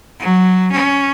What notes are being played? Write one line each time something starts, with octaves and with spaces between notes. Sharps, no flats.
F#3
C#4